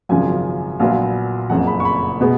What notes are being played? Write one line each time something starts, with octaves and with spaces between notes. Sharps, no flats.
G#1 F#2 C#3 F3 G#5
A#1 A#2 F#3 B3 F5
F#1 F2 C#3 F#5
B5
C#6
B5
B2 G#3 B3